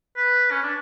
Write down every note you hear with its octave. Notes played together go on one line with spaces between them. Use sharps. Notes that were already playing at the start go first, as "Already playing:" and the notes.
B4
C#4
D4